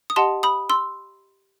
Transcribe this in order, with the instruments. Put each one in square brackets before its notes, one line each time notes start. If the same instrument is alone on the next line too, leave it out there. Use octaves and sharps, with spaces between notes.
[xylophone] D#6
G4 D#5 F#5 A5 C6
B5 D#6
C6 E6